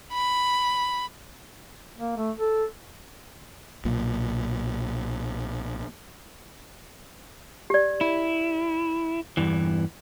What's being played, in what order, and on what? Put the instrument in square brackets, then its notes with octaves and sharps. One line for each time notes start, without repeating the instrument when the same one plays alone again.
[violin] B5
[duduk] A#3
A3
A4
[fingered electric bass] B1 A#2
[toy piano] G4 D5
[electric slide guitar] E4
E2 G2 E3